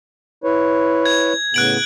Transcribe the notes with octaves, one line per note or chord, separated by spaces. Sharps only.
E4 B4 C#5
G#6
A2 C#3 B3 F#6 D7 F#7